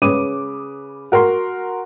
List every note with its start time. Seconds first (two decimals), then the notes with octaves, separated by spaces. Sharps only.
0.02 C#3 B4 C#5 D6 D#6 D#7
1.12 F#4 A#4 F#5 C6